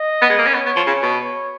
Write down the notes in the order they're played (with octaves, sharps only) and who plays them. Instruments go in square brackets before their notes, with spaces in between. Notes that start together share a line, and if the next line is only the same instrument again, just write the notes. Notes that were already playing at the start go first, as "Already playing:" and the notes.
Already playing: [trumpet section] D#5
[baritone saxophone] B3
G#3
A#3
C#4
[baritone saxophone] B3 [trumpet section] C#5
[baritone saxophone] B3
F3
C#3
B2
[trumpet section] C#5